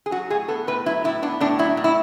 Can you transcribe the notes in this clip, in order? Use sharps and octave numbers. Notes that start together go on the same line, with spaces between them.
G#4
F#3 F#4
A2 G#4
B3 A4
A2 B4
F#3 E4
A2 E4
B3 D4
A2 D4
F#3 E4
A2
E4